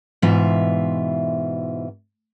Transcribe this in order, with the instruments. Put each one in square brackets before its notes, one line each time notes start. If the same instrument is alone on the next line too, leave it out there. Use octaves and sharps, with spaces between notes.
[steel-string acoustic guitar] G#2 B2 E3 F4 E5